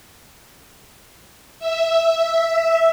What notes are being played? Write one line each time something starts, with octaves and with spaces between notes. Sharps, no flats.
E5